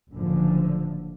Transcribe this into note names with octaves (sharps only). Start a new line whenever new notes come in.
F#1 A2 D3 F3